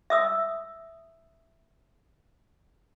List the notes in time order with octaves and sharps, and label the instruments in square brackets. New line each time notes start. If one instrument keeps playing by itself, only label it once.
[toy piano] E5 D#6 E6